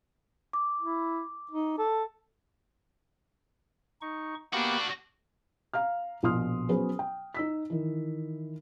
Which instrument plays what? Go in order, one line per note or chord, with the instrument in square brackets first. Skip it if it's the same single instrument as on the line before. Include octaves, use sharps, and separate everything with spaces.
[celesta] D6
[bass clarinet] E4
D#4
A4
[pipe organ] D#4 C#6
[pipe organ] A#3 B3 G4 [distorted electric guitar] D4 F#4
[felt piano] F5 A#5 F6
A#1 B2 F3 C6 D#6 F6
F#3 B3 C#4 G#4 B4 C5
G5
D#4 E6 B6
D#3 E3